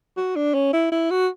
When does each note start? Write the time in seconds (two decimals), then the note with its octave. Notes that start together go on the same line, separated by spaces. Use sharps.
0.17 F#4
0.36 D4
0.55 C#4
0.73 E4
0.92 E4
1.11 F#4